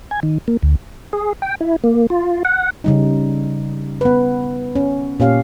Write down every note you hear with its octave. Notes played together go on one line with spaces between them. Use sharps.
G#5
D#3
A#3
D2
G#4
G5
E4
A#3
F4
F#5
C#3 G3 D#4
B3 B4
C#4
A#2 C#4 G4 F5